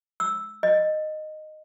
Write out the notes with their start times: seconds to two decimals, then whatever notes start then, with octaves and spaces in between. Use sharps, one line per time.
0.20 E6
0.63 D#5